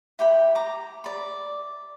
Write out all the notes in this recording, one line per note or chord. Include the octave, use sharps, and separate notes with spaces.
E4 G4 G5 B5
A#5 D6
D5 B5